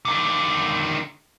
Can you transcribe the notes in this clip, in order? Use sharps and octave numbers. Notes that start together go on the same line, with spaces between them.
D3 D#3